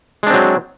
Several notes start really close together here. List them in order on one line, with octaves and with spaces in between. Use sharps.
G#3 D4 C4 F#3